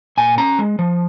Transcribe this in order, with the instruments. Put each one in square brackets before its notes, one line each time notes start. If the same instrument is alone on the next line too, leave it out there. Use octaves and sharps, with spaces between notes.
[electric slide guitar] A#2 G#5
C#4 A#5
G#3
F3